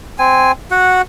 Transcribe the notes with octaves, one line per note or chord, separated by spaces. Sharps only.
C4 G#5
F#4 F#5